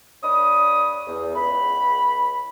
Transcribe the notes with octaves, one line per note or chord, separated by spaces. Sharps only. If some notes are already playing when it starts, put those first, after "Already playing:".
G2 D4 C#5 B5 D#6
E2
C#2 B5